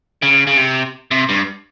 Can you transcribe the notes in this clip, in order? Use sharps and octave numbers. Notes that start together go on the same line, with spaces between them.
C#3
C#3
C3
C3
G2